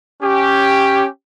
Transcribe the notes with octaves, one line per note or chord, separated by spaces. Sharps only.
C#4 G4